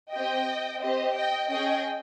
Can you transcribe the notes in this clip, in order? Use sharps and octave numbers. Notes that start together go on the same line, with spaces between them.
C4 G4 D#5 G5
C4 G4 C5 D#5
D#5 G5
C#4 G#4 D#5 G5